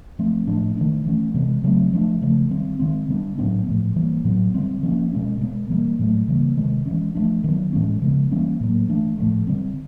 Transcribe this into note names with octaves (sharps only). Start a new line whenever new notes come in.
F3 A3 C4
A2 F3 A3 D4
D#3 F#3 A3 D4
E3 A3 C#4
C3 E3 G#3 B3
C#3 F#3 A3 C4
F3 A3 D4
C#3 F3 A3
D#3 G3 C4
D#3 G#3 C4
D3 G3 B3 D4
A2 F#3 B3 D4
A2 F3 A3
E3 G3 A#3
A2 F#3 B3
D3 G3 C4
F3 A#3 C#4
B2 G#3 C#4
B2 G#3 B3
E3 G3 A#3
A2 F#3 A3
C#3 E3 G3 A#3
C3 D#3 G#3
E3 G#3 C#4
F3 A3 D4
D#3 F#3 B3
A2 E3 G#3 C#4
C#3 F3 G#3 B3
E3 G3 A#3 C#4
A2 F#3 A#3
E3 A3 D4
A2 F3 A3
D3 G3 C4